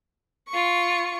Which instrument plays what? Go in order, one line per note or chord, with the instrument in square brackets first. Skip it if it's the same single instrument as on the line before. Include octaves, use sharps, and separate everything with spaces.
[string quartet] F4 C#6